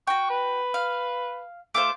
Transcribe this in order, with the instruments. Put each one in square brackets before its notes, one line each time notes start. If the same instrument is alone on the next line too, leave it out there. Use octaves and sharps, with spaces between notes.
[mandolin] F#4 G5 [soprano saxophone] C#6
[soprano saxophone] B4
[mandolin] F5
[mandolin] A3 F4 C5 [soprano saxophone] D6